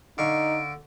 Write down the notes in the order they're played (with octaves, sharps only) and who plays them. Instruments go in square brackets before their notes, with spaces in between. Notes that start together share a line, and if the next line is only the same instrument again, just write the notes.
[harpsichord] D3 F5 C#6 [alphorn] D#4 [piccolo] D7